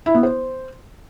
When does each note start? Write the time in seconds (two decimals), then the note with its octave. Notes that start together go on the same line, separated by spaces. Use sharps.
0.06 E4
0.15 B3
0.23 C5